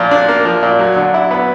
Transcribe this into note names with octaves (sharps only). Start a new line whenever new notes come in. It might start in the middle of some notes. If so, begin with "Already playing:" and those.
Already playing: A#2 F3
D4
A#3
F3
A#2
F#3
D3
E4
B3